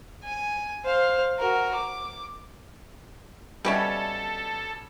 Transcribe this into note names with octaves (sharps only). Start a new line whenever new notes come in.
G#5
C5 F5
F#4 A#4
D6
B2 G3 C#4 A4 D5 E5